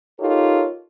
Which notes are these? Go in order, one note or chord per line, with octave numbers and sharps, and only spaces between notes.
D#4 F4 G4 A4 A#4 C#5